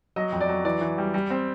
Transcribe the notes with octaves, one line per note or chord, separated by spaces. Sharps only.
F#3 D#5
F2
D5
F#3
E3 D5
E3
G3
G3
C4